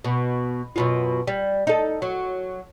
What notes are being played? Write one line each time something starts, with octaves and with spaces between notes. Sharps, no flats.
B2
F#2 B2 F4
G3
D#4 A4
F#3